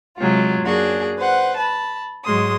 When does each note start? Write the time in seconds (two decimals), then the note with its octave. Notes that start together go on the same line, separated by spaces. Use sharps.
0.18 C3 F#3 G#3 F4
0.63 F#2 A#3 D4 F#4 G#4
1.18 B4 C5 F#5
1.57 A5 B5
2.24 G#2 F#3 G#3 C6 D#6